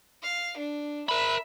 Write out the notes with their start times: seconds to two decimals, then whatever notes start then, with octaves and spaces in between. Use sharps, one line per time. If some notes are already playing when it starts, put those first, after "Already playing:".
0.23 F5
0.58 D4
1.09 A#4 E5 B5